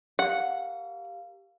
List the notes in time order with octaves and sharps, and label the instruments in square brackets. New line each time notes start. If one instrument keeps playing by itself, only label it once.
[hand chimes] G4 A#4 F5 [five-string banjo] F#5